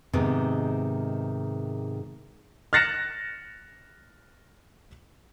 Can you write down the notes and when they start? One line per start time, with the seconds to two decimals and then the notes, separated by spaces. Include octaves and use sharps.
0.13 G#2 C3 D#3 G#3 B3
2.73 F6 F#6 A6 A#6 C#7 E7